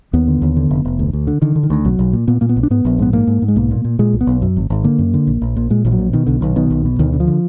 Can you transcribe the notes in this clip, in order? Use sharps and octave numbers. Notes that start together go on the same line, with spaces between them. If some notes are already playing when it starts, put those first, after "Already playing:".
D#2 B3
D3
D#2
D3
F1
F1
D2
D2
D3
D3 D#3
D3
D#3
D2
B1 F#3
B1
A#2
A#2 B3
A#2 A#3
B3
B1
D4
G#2 B3
A#1
G#2 B3
G#2 A#3
G#2
G#2
G#3
B1 A#3
A#2
A#2
A#2 G#3
B1
B3
B1
F#2
G#1
G#1
D3 A#3
F#2
D3
A#1
A#1
A#2
A#2 G#3
A#1 F3
F#3
A#2
B2 D#3
B1 D3
B1 D#3
B2 D#3
B1
B2
D2 D#3
D3
F3
D3